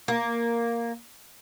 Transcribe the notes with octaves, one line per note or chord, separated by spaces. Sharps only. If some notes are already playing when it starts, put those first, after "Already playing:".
A#3